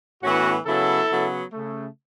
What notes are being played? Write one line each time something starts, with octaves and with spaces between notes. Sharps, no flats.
A2 E3 B3 C#4 F#4
C#3 F#3 B3 E4 A4
C#3 F#3 B3
C#3 A3